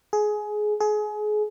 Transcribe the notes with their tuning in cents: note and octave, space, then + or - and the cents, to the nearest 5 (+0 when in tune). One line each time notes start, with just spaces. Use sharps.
G#4 +20
G#4 +30